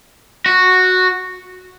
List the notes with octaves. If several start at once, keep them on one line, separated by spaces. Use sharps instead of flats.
F#4